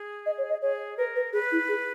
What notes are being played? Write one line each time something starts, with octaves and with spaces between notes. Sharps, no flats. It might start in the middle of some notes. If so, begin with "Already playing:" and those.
Already playing: G#4
D#5
C#5
D#5
G#4 C#5
A#4 B4
B4
G#4 B4
E4
G#4